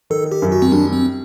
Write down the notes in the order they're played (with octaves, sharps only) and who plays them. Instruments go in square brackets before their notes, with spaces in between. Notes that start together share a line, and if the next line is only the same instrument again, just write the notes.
[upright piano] D#3 [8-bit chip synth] A4
[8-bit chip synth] G4
[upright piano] F#2
[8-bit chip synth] F#4
C4
[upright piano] G3 [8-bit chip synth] D4
[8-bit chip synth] C4